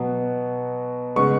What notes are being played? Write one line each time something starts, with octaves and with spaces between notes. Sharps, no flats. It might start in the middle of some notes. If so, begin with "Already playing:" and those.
Already playing: B2 F#3 B3
C#3 G#3 B3 C#6